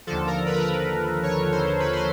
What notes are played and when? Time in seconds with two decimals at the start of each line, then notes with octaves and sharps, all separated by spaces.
0.07 D#2 D3 F3 A4
0.27 A#4
0.46 B4
0.54 A#4
0.62 B4
1.23 C#5
1.52 C5
1.80 B4
1.93 C5